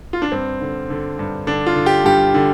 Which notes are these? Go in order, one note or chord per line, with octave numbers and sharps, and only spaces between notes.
F4
D4
G2 C4
D3
D3
G2
D3 D4
F4
D3
G4
G2 G4
D3